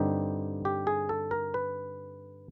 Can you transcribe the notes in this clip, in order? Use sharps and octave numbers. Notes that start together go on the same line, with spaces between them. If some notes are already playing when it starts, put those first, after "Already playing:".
Already playing: G2 D3 G3 C4 D#4 G4
G4
G#4
A4
A#4
B4